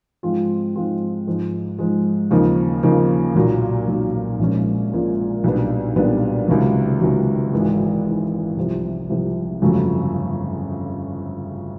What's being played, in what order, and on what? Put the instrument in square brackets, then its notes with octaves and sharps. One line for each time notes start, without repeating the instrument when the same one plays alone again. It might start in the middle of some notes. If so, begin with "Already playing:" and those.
[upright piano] G#2 F3 G#3 C4 F4
G#2 F3 G#3 C4 F4
G#2 F3 G#3
G#2 F3 G#3
D#2 C#3 F3 A#3 D#4
D#2 C#3 F3 A#3 D#4
B1 A#2 F#3
B1 A#2 F#3
A#1 A#2 F3 G#3 C#4
A#1 A#2 F3 G#3 C#4
B1 A#2 G3 B3 D4
B1 A#2 G3 B3 D4
C#2 C3 D#3 F#3
C#2 C3 D#3 F#3
G#1 G#2 E3 G#3
G#1 G#2 E3 G#3
C2 C3 F3
C2 C3 F3
G1 F2 C#3 F#3 A3